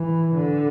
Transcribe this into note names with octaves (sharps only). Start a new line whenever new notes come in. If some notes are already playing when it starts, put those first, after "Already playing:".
Already playing: E3
D3